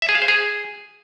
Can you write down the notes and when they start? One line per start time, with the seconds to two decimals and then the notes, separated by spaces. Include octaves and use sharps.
0.02 E5
0.09 G#4
0.15 F5
0.22 C5
0.28 G#4